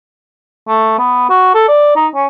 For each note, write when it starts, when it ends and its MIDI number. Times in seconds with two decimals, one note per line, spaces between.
0.68 0.94 57
0.99 1.29 59
1.30 1.51 66
1.55 1.64 69
1.68 1.96 74
1.96 2.07 63
2.15 2.27 61